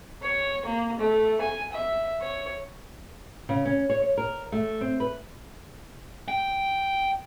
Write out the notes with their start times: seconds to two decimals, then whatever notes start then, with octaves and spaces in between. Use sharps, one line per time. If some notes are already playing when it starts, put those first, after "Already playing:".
0.22 C#5
0.66 A#3
0.99 A3
1.41 G#5
1.73 E5
2.21 C#5
3.49 C#3
3.65 C#4
3.90 C#5
4.02 C#5
4.17 A#4
4.52 A3
4.81 C4
5.00 B4
6.28 G5